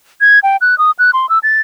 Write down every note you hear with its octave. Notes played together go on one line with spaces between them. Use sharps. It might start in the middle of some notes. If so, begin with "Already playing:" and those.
G#6
G5
F#6
D#6
F#6
C6
E6
A6